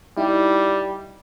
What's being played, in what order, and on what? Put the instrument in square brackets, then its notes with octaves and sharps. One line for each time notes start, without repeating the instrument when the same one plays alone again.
[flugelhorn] G3 [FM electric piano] D#4 E4